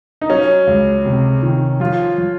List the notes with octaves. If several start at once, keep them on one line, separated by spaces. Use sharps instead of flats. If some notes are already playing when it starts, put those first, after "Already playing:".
D#4
F#3 C#4
C#2
C3
D#3
F3 F4
F3